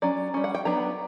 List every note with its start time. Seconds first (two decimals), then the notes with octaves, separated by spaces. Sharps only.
0.02 F#3 C#4 D5
0.34 G3 C#4
0.44 F#5
0.55 G5
0.65 F#3 B3 D4 A#5